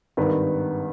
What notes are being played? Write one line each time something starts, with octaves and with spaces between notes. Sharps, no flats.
G#1 G2 D#3 B4